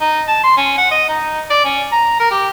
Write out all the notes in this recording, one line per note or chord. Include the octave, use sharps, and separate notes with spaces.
D#4
A5
C6
C#4
F#5
D#5
D#4
D5
C#4
A#5
A#4
G4